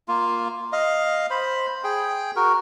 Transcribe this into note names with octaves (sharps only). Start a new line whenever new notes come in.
A#3 F4
D#5 F5
C5 B5
G#4 G5
F#4 A#4